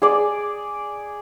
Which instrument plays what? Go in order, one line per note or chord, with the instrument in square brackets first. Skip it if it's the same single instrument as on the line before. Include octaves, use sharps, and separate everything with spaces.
[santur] G#4 D5